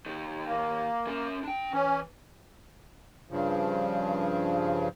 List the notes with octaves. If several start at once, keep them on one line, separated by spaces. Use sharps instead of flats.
D#2 D#3
A#3
C#4 A#4
D4 G5
E3 C#4
G2 C#3 F3